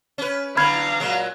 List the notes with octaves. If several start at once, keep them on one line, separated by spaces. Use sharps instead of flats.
C#4 B4
E2 D3 E3 F5 A#5 B5 F6 G#6
A#2 F#3 G#3